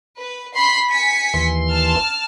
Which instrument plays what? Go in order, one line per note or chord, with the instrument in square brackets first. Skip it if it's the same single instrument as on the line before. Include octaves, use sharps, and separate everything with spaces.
[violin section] B4
B5 C6
G#5 B6 C#7
[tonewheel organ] D#2 E3 C6
[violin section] A5 F6